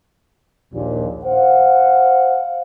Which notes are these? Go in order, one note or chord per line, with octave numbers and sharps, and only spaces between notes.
A#1 D#2 A#2
C5 F5 F#5